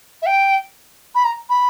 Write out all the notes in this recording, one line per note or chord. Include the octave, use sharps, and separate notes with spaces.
E5
G5
B5
A#5
B5